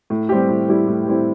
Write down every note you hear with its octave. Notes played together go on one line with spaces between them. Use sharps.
A2
G3 C4 E4 G4
A2
G3 C4 E4 G4
A2
G3 C4 E4 G4